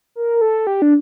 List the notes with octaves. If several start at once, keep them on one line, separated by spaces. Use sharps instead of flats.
A#4
A4
G4
D4